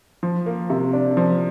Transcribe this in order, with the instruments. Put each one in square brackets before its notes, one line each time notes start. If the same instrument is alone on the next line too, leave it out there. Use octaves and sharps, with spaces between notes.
[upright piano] F3
A#3
C3
D4
F3